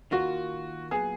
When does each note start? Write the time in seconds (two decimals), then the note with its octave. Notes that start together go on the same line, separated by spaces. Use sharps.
0.11 D#3 A#3 F4 F#4
0.91 A#2 F#3 B3 G#4